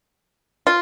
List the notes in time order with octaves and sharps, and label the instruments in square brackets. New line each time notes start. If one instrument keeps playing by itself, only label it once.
[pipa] F4